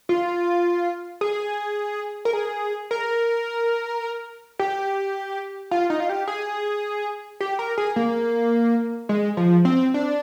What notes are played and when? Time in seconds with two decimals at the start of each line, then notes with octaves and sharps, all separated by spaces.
0.09 F4
1.21 G#4
2.25 A#4
2.33 G#4
2.91 A#4
4.59 G4
5.71 F4
5.90 D#4
6.00 F4
6.09 G4
6.28 G#4
7.41 G4
7.59 A#4
7.78 G#4
7.96 A#3
9.09 G#3
9.37 F3
9.65 C4
9.94 D4